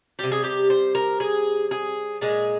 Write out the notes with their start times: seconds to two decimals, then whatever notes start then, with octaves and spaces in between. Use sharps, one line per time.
0.19 C3 G3 G4
0.32 G#4
0.44 G4
0.70 C5
0.95 A#4
1.20 G#4
1.71 G#4
2.21 A#2 G#3 G#4